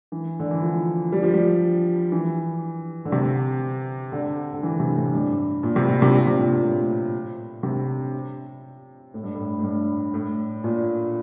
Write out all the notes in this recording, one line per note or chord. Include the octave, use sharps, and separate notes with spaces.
E3
D3
E3
F3
G3
F3
G3
E3
D3
C3
D3
D3
E3
C3
A2
G2
A#2
C3
A#2
C3
A#2
C3
A#2
A2
C3
A2
G2
A2
A2
G2
A2
A#2